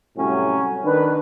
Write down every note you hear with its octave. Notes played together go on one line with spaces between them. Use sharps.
C2 A2 F#3 C#4
D#3 D4 B4